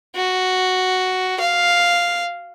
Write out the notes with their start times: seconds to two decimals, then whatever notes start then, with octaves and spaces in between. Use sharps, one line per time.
0.16 F#4
1.40 F5